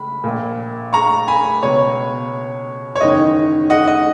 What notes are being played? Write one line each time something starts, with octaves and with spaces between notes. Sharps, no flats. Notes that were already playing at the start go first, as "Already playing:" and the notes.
Already playing: C#2 B5
A#1 A#2
A#5 C#6
G#5 B5
C#2 B2 C#5
C#5
F#1 E2 D#3 D#5
D#5 F#5
D#5